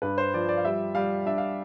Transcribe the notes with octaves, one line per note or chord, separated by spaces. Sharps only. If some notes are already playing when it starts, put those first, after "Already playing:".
G2 B4
C5
F3 D5
D5
F5
G3 E5
G3 F5
D4 E5
F5